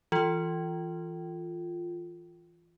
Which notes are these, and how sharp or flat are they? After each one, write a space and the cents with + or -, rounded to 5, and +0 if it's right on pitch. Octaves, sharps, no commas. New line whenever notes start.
E3 +0 F4 +0